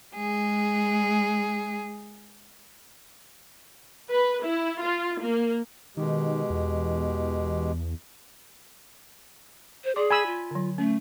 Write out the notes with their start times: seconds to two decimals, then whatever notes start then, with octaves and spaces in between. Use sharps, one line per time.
0.14 G#3 G#4
4.13 B4
4.45 E4
4.82 F4
5.21 A#3
5.97 B2 D#3 G#3 G4
6.50 E2
9.84 C5
9.96 G#4 D5 C6 D6
10.11 G#5 B5 E6
10.26 F4
10.51 D3 F#3
10.78 A3 C#4